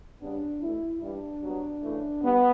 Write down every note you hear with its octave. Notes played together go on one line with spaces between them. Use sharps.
C#3 G3 B3 D4
E2 B2 A3 E4
G2 E3 G3 D4
G2 F#3 B3
C#3 E3 A3
G2 B3